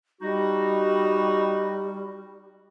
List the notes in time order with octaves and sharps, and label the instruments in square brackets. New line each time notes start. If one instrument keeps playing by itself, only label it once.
[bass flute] G3 [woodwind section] D#4 F#4